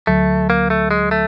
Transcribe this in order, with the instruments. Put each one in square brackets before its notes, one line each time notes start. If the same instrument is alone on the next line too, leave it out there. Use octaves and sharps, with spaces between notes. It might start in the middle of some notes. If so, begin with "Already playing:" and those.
[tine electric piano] D2 D3 F#3 [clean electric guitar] A3
[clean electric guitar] A#3
A3
G#3
A3